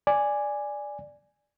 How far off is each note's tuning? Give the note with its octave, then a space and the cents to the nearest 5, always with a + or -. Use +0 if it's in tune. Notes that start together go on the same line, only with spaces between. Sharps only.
D5 +0 G#5 -5